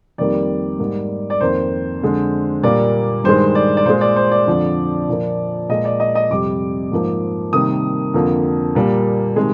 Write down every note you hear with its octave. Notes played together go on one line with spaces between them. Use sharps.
F2 D#3 G3 A#3 D5
G#2 G3 A#3
D5
F2 D#3 A#3 C5
F2 D3 G#3
A#2 G3 A#3 D5
G2 D#3 G#3 C5
D5
D5
A#2 G#3 C5
D5
C5
D5
F2 D3 F3
A#2 F3 A#3
A#2 G#3 D#5
D5
D#5
D#5
F2 C3 G3 D6
G#2 F3 A#3
C3 D#3 G3 A#3 D#6
F2 D3 F3 A#3
A#2 G3 A#3
C3 D#3 G#3